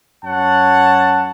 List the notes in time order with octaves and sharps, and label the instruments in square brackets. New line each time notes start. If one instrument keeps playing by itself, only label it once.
[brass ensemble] F#2 C#5 F#5 A5